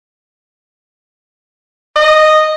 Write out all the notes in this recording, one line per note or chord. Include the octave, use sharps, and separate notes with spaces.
D#5